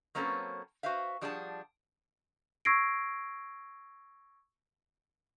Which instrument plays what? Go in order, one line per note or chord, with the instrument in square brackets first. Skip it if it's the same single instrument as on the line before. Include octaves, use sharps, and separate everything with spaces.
[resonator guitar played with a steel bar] F#3 A#3 C4 C#4 A4 B4
F#4 B4 C5 E5 F5
F3 G3 D4 G#4 F#5 A5
[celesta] C#6 E6 G#6 A#6 C7 D7